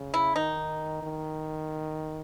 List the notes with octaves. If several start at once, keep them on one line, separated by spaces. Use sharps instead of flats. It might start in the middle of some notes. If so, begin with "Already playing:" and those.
Already playing: C#3
E4
D#3 D#4
D#3